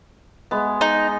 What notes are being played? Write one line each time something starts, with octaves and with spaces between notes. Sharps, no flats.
G#3 B3
D#4